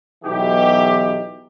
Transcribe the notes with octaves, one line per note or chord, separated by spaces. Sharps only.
B1 B2 E3 D#4 G4